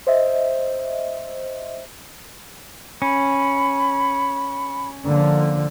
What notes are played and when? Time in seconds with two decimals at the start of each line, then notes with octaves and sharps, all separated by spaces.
0.07 C5 D#5 E5
3.02 C#4 B5
5.06 D3 F3 A#3